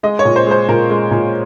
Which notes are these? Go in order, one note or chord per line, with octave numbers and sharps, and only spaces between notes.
G#3 D#5
C#5
A#2
C5
G#3 C5
A#2 A#4
G#3
A#2